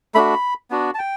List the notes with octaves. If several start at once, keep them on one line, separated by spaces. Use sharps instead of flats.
A3 D4 F#4 B5
B3 D4 F#4
A5
G5